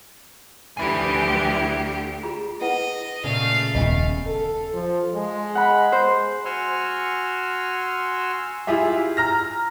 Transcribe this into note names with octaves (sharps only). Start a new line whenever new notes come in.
D2 E4 G4 G#5
F4 G#4 A#5
E4 B4 D#5 F#5
A#2 C#3 A3 F5
D#1 B3 D#5 E5 G#5
A4
F3
G#3
F#5 B5
C5
F#4 G#5 C6 C#6 E6 F6
E4 F4 G4 G#4 E5
A#5 F6 A#6